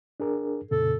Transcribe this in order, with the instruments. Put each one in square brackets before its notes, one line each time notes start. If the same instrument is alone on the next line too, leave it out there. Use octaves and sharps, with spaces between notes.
[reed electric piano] D4 G#4 A#4
[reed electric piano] F2 A#2 C#3 [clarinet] A4